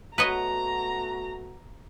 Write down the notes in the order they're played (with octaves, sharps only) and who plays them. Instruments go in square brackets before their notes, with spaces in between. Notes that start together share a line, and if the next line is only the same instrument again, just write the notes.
[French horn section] A3 B3 F#4 [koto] B4 C#5 D#5 [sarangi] A#5